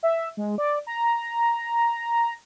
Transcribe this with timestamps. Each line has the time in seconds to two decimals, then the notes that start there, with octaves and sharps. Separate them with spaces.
0.03 E5
0.37 G#3
0.58 D5
0.87 A#5